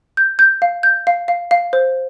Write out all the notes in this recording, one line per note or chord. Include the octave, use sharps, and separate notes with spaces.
G6
G6
F5
G6
F5
F5
F5
C5